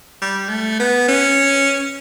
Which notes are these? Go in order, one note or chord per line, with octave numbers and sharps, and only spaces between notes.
G3
A3
B3
C#4